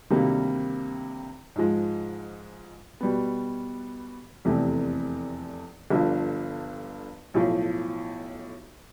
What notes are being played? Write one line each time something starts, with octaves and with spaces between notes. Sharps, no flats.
D2 C3 D#3 G3 A#3
G#2 F3 G#3
B2 G3 B3
F1 E2 C3 E3 A3
G1 G2 D3 F3
B1 A2 F3